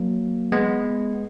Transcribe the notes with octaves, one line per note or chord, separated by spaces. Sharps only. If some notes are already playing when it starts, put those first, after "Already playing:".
Already playing: F#3 A#3
G#3 B3